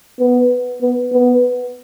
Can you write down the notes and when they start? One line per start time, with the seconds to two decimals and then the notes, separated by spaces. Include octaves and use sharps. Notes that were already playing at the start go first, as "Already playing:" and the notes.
0.20 B3
0.82 B3
1.13 B3